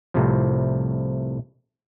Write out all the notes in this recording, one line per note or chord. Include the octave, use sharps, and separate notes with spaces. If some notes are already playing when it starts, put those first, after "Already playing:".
C2 A2 C3 F3